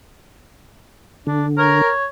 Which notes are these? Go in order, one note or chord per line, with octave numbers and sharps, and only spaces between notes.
D3 D4
A#4 C#5